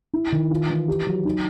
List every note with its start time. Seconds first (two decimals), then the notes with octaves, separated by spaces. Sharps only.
0.13 E4
0.32 D#3
0.51 F4
0.70 E3
0.88 G4
1.06 F#3
1.25 D#4